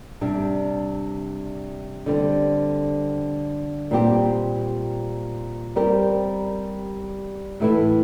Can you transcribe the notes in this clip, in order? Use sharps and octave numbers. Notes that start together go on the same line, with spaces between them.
C3 G3 D4
D3 G3 C4
A#2 G3 C4 G4
G3 C4 G4 A#4
A2 E3 A3 E4